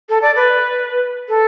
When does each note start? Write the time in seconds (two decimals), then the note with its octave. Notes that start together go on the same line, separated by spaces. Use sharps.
0.09 A4
0.22 D5
0.36 B4
1.29 A4